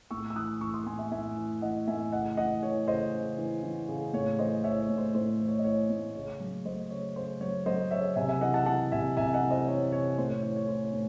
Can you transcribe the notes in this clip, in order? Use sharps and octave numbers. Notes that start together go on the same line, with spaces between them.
A2 C#6 E6
E6
E3 D#6 F#6
E3 C#6 E6
C6 D#6
A2 G#5 C6
E5 G#5
A2 E5 G#5
E3
E3 D#5 F#5
A2 E5 G#5
C#3 D#5 F#5
E3 D#5 F#5
E3 C#5
C#3 C5 D#5
C#3
E3
E3
C#3
A2 C#5
E3 C5 D#5
E3 C#5 E5
C#5
A2
C5
A2 C5
E3
C#5
D#5
E3 C#5
A2
C#3 C#5
F#3
F#3 C5 D#5
C#3 C#5
C#3 C5
F#3 C#5
F#3 C5 D#5
C#3 C#5 E5
C3 E5 G#5
E5 G#5
E3 D#5 F#5
F#5 A5
E3 F#5 A5
C3 E5 G#5
C3 E5 G#5
D#5 F#5
E3
C5 D#5
E3 C#5
C3 C#5
A2 C5
C#5
E3 C#5
C#5
E3 C5
C#5
A2